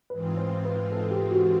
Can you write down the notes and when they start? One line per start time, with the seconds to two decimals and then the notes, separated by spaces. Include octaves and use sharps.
0.10 G#2 E3 G#3 C4 F4 B4
0.37 C5
0.65 B4
0.92 A4
1.11 G4
1.32 F#4